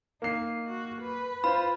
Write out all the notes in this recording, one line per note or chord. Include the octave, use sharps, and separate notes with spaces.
A#3 D#4 C7
F#4
B4
F4 C5 B5